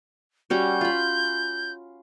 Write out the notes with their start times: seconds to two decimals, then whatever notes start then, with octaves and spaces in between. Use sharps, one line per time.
0.50 G3 C#4 F#4 G6
0.81 F4 B5